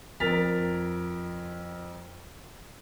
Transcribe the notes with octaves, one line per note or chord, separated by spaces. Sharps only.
F2 A#4 A6 B6 F7